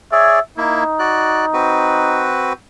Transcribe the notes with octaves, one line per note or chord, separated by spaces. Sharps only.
G#4 C#5 D5 E5
A#3 D#4 E4
F#4 D5 F#6
C4 F#4 B4